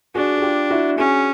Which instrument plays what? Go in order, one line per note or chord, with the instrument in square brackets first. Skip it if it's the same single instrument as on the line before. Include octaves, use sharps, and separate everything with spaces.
[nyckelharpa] D4 [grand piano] F#4 G#4
[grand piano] F#4
F4 G4
E4 F#4
[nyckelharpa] C#4 [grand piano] F#4 G#4